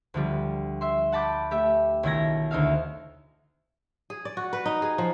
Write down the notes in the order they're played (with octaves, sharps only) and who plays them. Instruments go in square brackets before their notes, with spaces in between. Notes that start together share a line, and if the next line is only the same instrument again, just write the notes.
[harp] D2 F3 G3
E5 C6
F#5 A5 B5 D6 G6
A3 G4 E5
B1 D#3 E4 G#6 A#6
D2 D#4 E5 F5
[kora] G#4
D5
F#4
B4
D#4
G#4
F3